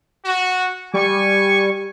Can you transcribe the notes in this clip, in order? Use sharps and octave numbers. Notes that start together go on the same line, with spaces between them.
F#4
G3 G#5 C#6